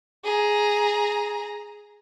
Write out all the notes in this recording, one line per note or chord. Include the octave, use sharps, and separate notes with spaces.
G#4 A#5